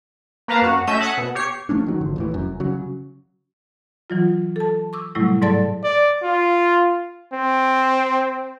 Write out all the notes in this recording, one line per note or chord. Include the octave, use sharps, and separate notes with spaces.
A#3 A#4 B4 F5 A5 A#5
F#2 F#4
A3 C#4 D#5 E5 G6 E7
E5 F#5 A5 D#6 F#6 G#6
B2
G4 C#5 C7 C#7
F3 A3 C#4 D4
D#3 F#3
G#1 D3 F3
D#2 A2 E3
F1 F#2
C#3 F#3
E3 F#3 F4
A4 A5
C#6 D6 E6
A2 C3 F#3 G3 A3 E4
G#2 F#3 A4 D5 A5 A6
D5
F4
C4